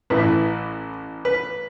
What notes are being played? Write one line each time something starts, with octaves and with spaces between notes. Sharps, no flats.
A1 A2 E3 B4
B4